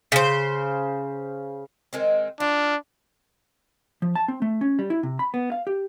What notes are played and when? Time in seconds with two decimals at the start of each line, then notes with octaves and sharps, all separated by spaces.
0.12 C#3 C5
1.93 D#3 G#3 C4
2.40 D4 F4
4.02 F3
4.15 A5
4.28 C4
4.42 A3
4.61 C#4
4.79 G3
4.90 E4
5.03 C3
5.19 B5
5.34 B3
5.52 F5
5.67 G4